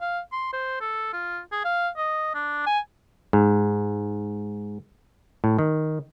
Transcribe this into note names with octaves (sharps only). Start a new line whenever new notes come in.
F5
C6
C5
A4
F4
G#4
F5
D#5
D4
G#5
G#2
A2
D#3